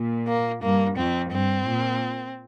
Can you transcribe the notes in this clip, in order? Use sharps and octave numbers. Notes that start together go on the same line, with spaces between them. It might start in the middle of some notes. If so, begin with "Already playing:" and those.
Already playing: A#2
A#3
G2 A#3
F2 C4
G2 C4
A#2